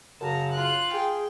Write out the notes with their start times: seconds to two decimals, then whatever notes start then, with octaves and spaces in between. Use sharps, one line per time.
0.21 F#2 C#3 A5 A#5
0.53 F4 F#6
0.94 G#4 G5